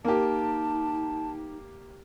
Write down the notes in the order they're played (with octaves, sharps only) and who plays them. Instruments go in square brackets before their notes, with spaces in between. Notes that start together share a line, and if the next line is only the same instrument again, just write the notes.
[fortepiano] A#3 G4 [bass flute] D#4 [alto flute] A5